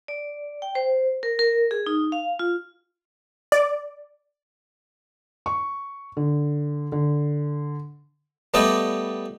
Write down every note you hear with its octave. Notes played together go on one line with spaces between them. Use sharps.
D5
G5
C5
A#4
A#4
G#4
D#4
F5
F4
D5
C#6
D3
D3
G3 A3 B3 G4 D5 D#5